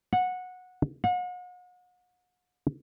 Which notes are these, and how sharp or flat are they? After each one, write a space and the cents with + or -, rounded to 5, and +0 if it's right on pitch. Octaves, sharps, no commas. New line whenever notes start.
F#5 -15
F#5 -40